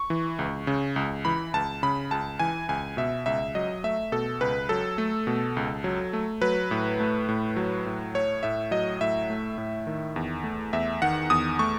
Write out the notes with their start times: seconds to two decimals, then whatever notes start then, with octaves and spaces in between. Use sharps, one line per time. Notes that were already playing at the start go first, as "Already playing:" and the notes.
Already playing: C#6
0.10 E3
0.39 C#2
0.67 C#3
0.96 C#2
1.25 E3 B5
1.54 C#2 A5
1.83 C#3 B5
2.11 C#2 A5
2.39 E3 G#5
2.69 C#2 G#5
2.97 B2 E5
3.26 C#2 E5
3.55 F#3 D#5
3.84 A3 E5
4.12 B2 A4
4.40 C#2 B4
4.69 F#3 A4
4.98 A3
5.27 B2
5.57 C#2
5.84 F#3
6.13 A3
6.42 F#3 B4
6.71 A2
7.00 A3
7.29 A2
7.56 F#3
7.86 A2
8.15 A3 C#5
8.43 A2 E5
8.71 F#3 D#5
9.01 A2 E5
9.30 A3
9.58 A2
9.87 D#3
10.16 E2
10.44 A3
10.73 E2 E5
11.02 D#3 F#5
11.30 E2 D#6
11.59 A3 C#6